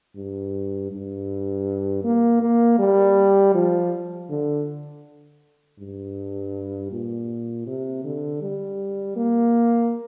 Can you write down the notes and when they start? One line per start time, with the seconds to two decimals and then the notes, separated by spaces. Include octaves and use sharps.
0.17 G2
0.92 G2
2.04 A#3
2.41 A#3
2.79 G3
3.54 F3
4.30 D3
5.79 G2
6.92 A#2
7.67 C3
8.04 D3
8.42 G3
9.16 A#3